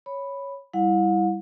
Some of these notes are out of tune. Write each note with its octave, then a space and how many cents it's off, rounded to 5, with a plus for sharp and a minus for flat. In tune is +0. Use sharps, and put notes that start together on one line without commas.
C#5 +0 B5 +0
G3 +0 E4 -5 F#5 -45